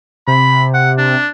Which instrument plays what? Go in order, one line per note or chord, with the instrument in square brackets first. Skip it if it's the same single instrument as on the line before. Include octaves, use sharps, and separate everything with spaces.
[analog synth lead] C3 [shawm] B5
[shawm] F#5
D4